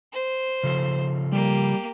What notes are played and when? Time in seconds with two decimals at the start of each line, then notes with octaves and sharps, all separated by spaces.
0.13 C5
0.63 C#3 F3 A4
1.32 G3 A#3 G4